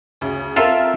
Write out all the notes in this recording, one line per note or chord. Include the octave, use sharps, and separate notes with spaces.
D2 C#3
C4 F4 A4 A#4 E5 F5